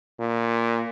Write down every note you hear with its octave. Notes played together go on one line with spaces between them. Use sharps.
A#2